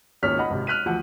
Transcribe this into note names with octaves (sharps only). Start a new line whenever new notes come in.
G#1 C#2 A#3 C#4 F6 B6
D#5 F#5 B5
G#1 C3
F6 F#6 B6 D#7
D2 E3 F3 E4 F#5